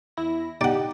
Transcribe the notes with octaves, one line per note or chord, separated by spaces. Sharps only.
E2 E4 A#6
D#4 G4 D5 F#5